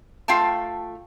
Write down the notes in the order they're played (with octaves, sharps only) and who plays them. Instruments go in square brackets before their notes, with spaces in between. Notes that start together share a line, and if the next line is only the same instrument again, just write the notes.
[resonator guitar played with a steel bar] A3 F4 F5 G5 A5